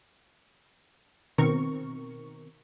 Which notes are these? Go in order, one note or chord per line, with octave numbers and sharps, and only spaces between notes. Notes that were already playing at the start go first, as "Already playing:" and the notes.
B2 D#3 C4 A#4 C#6